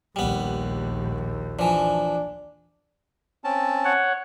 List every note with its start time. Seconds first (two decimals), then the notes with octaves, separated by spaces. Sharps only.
0.16 A#1 D#2 G3 B3
1.59 E3 F3 D4
3.44 C4 C#4 A5
3.85 C#5 F#5